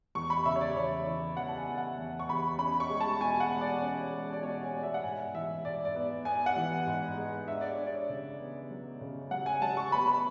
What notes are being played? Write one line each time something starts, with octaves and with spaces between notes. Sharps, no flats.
E2 C#6
B5
C#3 E5
C#5
D5
E2 C#5
E3 D5
E2 F#5
A5
G#5
E2
F#5
E2
C#6
E2 B5
C#4 B5
C#6
G#3
A5
B2 G#5
F#5
G#3
D5
C#4
G#3
D5
B2 C#5
G#5
B2 D5
E5
F#5
G#2 G#5
E3 E5
G#2 D5
D5
B3
B3 G#5
F#5
E3
G#2
G#3
D4 E5
D5
D4 C#5
D5
C#3
B3
F#3
C#3
F#3 F#5
G#5
F#3 A5
C#6
B3 B5
B5